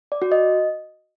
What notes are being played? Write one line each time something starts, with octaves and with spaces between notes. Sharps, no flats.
D5
F#4
D#5